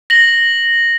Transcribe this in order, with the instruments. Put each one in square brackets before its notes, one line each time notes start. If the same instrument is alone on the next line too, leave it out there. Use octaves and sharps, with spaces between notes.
[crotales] A#6 F#7